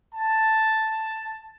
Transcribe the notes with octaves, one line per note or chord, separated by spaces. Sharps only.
A5